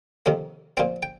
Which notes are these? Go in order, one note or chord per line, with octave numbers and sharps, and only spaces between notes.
F2 C3 D#3 A#3
A#2 F3 C4 G5
G5